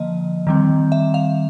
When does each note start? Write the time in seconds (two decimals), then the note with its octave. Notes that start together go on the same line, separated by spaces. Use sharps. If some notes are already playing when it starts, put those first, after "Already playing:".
Already playing: D3 F3 A#3 D#5
0.47 D#3 G3 C4
0.92 E5
1.14 F5